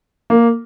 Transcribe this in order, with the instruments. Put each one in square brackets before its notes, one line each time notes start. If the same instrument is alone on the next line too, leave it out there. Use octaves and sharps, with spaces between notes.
[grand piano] A#3